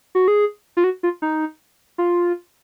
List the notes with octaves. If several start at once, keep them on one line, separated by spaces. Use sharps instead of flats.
F#4
G#4
F4
F#4
F4
D#4
F4